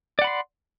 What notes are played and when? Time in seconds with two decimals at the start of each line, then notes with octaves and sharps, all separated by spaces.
0.19 D5
0.22 F#5
0.24 B5
0.27 C6